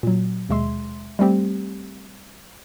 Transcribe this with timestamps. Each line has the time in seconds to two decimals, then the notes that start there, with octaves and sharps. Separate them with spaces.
0.03 A#2 F#3
0.49 D#2 B2 G#3 E5 C6
1.19 G3 A3 C4 G4